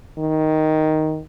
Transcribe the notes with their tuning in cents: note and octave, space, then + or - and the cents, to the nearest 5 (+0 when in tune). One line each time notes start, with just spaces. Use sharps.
D#3 +5